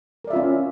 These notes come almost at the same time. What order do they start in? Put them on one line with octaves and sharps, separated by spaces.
A#4 D5 E5 F4 C#4